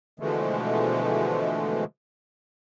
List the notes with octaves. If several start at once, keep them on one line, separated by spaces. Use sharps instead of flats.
B2 D3 E3 F3 G#3 A3